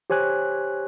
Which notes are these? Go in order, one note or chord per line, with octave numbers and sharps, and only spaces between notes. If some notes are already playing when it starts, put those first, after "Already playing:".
G4 C5 C#5 G#5 F#6